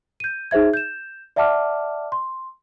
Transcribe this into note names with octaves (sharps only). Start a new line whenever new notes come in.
G6 D#7
D#4 G#4 C5 E5 G#6
G6 E7
D5 E5 F#5 A5 D6 F6
C6